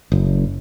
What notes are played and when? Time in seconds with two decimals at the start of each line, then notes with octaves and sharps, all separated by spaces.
0.12 F#1